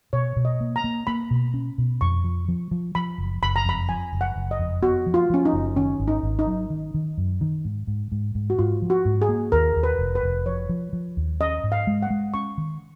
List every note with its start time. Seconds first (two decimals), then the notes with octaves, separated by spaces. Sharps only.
0.13 B2 C#5
0.36 B2
0.45 D#5
0.60 A#3
0.76 A#5
0.84 A#3
1.07 A#3 B5
1.31 B2
1.54 C#4
1.78 B2
2.01 F2 C#6
2.24 F3
2.48 F3
2.71 F3
2.95 F3 B5
3.18 F#1
3.43 F#1 B5
3.56 A#5
3.65 F2 B5
3.89 F3 G#5
4.13 F#1
4.21 F#5
4.36 F#1
4.51 D#5
4.60 F2
4.82 B3 F#4
5.06 F3
5.14 F4
5.30 F3 C#4
5.45 D#4
5.53 F#1
5.76 D#3 C#4
6.00 G#1
6.08 D#4
6.23 G#1
6.39 D#4
6.47 F#3
6.70 D#3
6.94 D#3
7.18 F#2
7.41 D#3
7.65 G#2
7.87 G#2
8.12 G#2
8.35 G#2
8.50 F#4
8.59 G#2 F4
8.82 F3
8.90 F#4
9.05 G#2
9.22 G#4
9.29 A#3
9.52 D#2 A#4
9.76 D#2
9.83 B4
9.99 F1
10.15 B4
10.23 F1
10.46 F3 C#5
10.69 F3
10.93 F3
11.17 D#2
11.40 C#4 D#5
11.63 G#2
11.72 F5
11.87 G#3
12.03 F#5
12.10 G#3
12.34 C#4 C#6
12.58 D#3